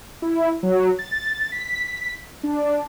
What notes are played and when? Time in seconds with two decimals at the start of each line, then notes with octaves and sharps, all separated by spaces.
0.22 E4
0.63 F#3
0.99 A6
1.52 B6
2.43 D4